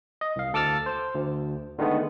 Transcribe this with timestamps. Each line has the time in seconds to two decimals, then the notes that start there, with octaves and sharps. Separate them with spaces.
0.21 D#5
0.36 C2 F5
0.53 D2 A4 D6 E6 F6 A6
0.86 C5
1.14 D2
1.78 D3 D#3 G#3 A3 B3